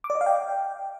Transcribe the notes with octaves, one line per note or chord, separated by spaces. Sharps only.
D6
D5
D#5
F5
G5